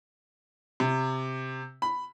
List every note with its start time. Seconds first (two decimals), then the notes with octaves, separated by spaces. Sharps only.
0.80 C3
1.82 B5